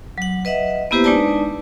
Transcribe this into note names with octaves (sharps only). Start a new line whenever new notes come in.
F#3 F#5
B4 D#5 E5 F#5
A#3 B3 E4 G4 B4 C5
G#3 D4 D#4 B4 D5 A5